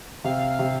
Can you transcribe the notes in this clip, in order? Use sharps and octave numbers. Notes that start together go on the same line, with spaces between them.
C3 F5
C3